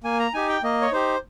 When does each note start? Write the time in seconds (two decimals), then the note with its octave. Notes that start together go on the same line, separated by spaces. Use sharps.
0.04 A#3 G#5
0.19 A#5
0.34 D#4 G4 G#5
0.49 G5
0.63 A#3 D#5
0.82 C#5
0.92 D#4 G4 C5